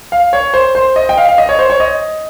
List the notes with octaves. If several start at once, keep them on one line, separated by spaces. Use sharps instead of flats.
F5
C#5
C5
C5
D#5
G5
F5
F5
D#5
C#5
C5
C#5
D#5